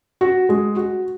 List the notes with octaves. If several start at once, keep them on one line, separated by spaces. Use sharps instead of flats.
F#4
G#3
F#4